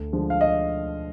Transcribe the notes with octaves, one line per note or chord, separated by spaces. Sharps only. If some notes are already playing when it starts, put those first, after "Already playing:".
Already playing: D2
D3 F3 G#3
F5
D#5